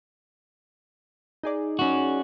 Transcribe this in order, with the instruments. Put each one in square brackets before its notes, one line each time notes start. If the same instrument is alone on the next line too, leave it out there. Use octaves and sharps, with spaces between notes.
[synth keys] D#4 G#4 D5
[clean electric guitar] C#4 F#4